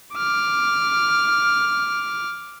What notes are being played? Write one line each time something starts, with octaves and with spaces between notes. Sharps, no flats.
D6 F6